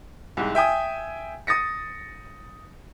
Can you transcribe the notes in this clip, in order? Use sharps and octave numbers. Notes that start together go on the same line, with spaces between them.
C2 G#2
E5 G5 G#5 D#6
D#6 A6 A#6 C#7